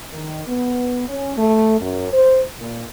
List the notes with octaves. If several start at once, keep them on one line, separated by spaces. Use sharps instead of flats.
D#3
B3
C#4
A3
F#2
C5
A#2